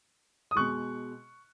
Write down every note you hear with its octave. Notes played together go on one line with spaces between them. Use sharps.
D#6
B2 G#3 C#6 F#6